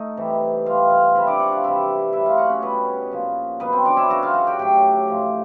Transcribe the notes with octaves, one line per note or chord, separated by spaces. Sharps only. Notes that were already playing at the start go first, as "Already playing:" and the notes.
Already playing: A3 D#4 A4 D#5
C3 E3 G3
C3 E3 G3 F4 F5
F4 F5
C3 F3 E4 E5
D4 D5
F#4 F#5
F4 F5
C3 E3 G3 E4 E5
A2 F#3 E4 E5
F4 F5
F#4 F#5
C#4 C#5
B2 G3 B3 B4
A#2 F3
B2 F#3 B3 B4
C4 C5
D4 D5
E4 E5
C#3 F#3 F#4 F#5
F4 F5
F#4 F#5
G4 G5
A2 F#3 G4 G5
A2 F3